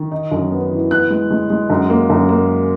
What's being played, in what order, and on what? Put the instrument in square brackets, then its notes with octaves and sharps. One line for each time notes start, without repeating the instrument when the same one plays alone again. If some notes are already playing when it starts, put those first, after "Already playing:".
Already playing: [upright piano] D#3
D#4
F#2
B3
E3
B3 F#6
G#3
G#3
G#3
F#2
A#3
F#2
A#3